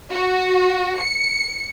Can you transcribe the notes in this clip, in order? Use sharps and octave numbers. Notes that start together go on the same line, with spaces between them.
F#4
C#7